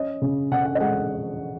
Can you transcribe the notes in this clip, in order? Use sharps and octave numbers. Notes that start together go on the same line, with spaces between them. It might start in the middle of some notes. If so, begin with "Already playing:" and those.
Already playing: C#4 D#5
C#3
C#3 F#5
F#5
D#5
G#3 F#5